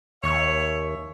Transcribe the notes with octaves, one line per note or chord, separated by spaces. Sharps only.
D#2 C#5 E5